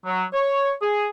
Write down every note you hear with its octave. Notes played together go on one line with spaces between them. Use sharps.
F#3
C#5
G#4